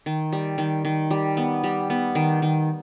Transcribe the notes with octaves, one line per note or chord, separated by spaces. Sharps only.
D#3
G3
D#3
D#3
G3
B3
G3
B3
D#3
D#3